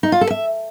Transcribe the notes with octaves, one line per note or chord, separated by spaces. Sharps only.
D#4
F4
A4
E5